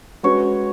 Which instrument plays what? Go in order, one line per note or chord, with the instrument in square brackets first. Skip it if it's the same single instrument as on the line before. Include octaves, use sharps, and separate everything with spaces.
[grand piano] G#3 C#4 F#4 B4 [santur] C#5